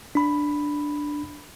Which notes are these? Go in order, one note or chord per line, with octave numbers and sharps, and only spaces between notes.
D4 B5